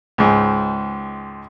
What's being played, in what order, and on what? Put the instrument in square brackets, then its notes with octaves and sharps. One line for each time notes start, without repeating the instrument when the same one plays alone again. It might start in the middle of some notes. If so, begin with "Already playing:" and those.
[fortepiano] C#2 G#2